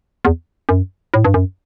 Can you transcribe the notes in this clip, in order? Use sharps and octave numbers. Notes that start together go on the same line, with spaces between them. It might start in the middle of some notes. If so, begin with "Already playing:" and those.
E2
F#2
A2
G2
F#2